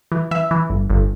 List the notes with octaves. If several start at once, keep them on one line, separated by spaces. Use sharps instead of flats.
E3
E3 E5
E3
G1
G1